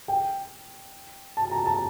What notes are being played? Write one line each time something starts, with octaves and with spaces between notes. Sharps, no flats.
G5
A5
A#5
A5